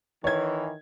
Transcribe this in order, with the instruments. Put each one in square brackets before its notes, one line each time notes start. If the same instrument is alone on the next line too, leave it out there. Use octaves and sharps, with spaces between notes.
[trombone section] D#3 E3 [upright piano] C#5 G#6